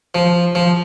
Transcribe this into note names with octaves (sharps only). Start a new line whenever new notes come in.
F3
F3